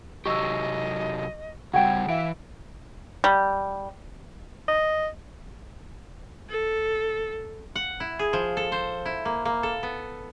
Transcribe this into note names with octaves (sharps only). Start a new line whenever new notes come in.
C3 F#3 G4 D#5 C#6 E6
C#3 G3 F#4 F#5 G5 G#6
E3 E5 F5 D7
G3
D#5
A4
F#5
E4
G#4
F3
A4
C5
E4
A#3
A#3
A4
B3